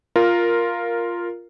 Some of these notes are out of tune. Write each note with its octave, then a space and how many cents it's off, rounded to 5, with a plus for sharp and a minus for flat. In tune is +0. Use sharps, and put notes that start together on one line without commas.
F4 +0 A#4 +0